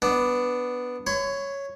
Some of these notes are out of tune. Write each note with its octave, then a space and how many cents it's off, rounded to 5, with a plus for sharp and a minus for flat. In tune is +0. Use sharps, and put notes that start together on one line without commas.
B3 +0 D4 +0
C#5 +0 B5 +45